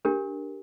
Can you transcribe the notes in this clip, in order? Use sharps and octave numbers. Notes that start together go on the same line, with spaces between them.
D4 G4 A#4